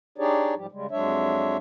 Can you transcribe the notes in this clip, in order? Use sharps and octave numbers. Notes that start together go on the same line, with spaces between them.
D4 D#4 G4 G#4 C#5 D5
G#2 F3 G3 G4
C#3 G3 G#3
F2 F#3 G#3 D4 C#5 E5